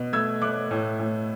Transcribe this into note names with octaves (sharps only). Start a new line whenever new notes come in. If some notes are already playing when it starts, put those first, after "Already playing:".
Already playing: B2
A3 E6 G#6
A3 D6 F#6
A2
A2